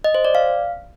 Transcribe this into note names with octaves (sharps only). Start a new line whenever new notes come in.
D#5
C5
D5
F5